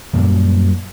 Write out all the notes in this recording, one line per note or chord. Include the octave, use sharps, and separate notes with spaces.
F#2 A#2 F#3 G3